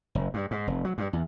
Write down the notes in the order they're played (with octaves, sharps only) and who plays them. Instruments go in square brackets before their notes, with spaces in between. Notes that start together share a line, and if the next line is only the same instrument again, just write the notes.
[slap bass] F#1
G2
G#2
F1
F#3
G2
E2